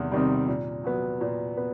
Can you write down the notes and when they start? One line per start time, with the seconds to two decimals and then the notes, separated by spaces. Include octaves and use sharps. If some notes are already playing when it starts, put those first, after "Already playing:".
Already playing: E2 C3 D#3 G3
0.11 C3 D#3 G3
0.48 A#2
0.84 F#3 B3
1.21 A#2
1.57 B3